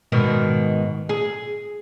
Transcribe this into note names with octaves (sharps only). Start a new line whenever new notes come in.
G#2 B2 D#3
G#4